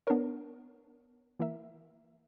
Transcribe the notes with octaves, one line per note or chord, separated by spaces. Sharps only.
B3 D4 A#4 C#5
E3 A#3 E4 A#4 E5